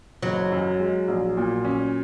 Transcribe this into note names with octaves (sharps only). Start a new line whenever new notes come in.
F#1 F#3
F#2
G#3
A#1
A#2
C#4